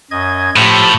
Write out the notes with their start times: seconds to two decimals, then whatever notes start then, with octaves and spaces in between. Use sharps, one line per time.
0.11 F#2 D#5 G#6
0.56 A2 F3 F4 G4